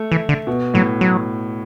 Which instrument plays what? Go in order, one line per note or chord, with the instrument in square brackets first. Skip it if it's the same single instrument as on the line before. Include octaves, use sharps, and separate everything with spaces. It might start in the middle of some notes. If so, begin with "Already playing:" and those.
Already playing: [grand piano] A3
[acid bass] E3
D3
[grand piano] B2
[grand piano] A2 [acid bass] F#3
[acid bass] F#3